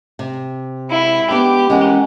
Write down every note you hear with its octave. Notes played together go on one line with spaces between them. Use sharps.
C3
G#3 E4 F#5 B5
B3 D4 G4 B4
E3 G#3 C#4 A#4 F#5